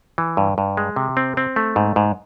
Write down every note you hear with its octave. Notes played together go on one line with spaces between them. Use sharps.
E3
G2
G2
G#3
C3
C4
C4
A3
G#2
G#2